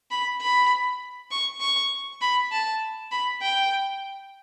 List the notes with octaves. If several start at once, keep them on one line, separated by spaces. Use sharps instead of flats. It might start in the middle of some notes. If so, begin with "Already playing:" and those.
B5
B5
C#6
C#6
B5
A5
B5
G5